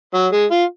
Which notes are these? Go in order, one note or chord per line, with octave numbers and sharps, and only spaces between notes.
F#3
G#3
F4